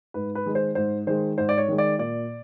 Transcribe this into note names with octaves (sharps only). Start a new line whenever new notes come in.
G#2 B4
B4
D#3 G#3
C5
G#2 C5
D#3 G#3 C5
G#2 C5
D5
C#5
D#3 G#3
D5
A#2 D5